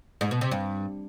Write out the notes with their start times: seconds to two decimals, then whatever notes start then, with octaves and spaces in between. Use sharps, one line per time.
0.21 G#2
0.31 B2
0.41 C3
0.51 G2